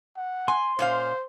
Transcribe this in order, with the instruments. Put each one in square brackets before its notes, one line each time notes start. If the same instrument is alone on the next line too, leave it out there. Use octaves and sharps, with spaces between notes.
[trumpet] F#5
[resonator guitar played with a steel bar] G#5 [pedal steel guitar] C6
[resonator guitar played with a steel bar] A#2 C#4 F5 [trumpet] C5